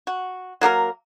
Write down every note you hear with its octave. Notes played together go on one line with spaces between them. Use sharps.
F#4
F#3 A#3 G4 A#4